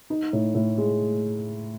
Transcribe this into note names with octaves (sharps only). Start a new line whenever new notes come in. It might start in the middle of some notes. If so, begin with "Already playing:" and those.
D#4
A2
A2
G#3